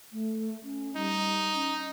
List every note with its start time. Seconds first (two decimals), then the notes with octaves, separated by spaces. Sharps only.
0.12 A3
0.63 C#4
0.96 G3 D#4
1.54 C#4